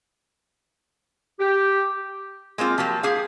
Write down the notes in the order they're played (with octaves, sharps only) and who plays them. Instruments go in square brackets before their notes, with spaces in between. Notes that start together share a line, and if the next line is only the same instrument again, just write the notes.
[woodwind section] G4
[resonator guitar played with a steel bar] G#3 A#3 C4 F4
F3 F#3 A#3 G4
G4 G#4 F5